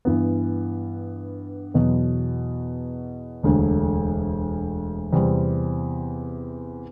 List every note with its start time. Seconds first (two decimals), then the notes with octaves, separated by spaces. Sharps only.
0.05 G2 E3 B3
1.74 E2 B2 F#3 B3
3.43 E1 D2 D3 A3
5.13 E2 C3 G3 C4